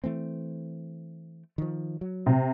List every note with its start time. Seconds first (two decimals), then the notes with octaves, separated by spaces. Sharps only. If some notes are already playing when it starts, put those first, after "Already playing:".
0.04 E3 A3 C4
1.58 D#3 F3
2.01 F#3
2.26 C3